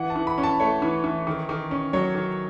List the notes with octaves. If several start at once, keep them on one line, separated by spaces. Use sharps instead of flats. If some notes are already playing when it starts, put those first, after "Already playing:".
Already playing: E3 F#5
A5
E3
B5
C#4
A5
A3 C#5
E3
E3
D#3
D#3
C#4
F#3 C#5
D#3